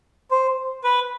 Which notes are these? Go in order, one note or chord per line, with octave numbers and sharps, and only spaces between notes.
C5
B4